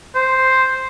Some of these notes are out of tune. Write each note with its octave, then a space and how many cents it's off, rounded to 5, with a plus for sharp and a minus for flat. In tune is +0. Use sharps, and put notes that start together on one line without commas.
C5 +0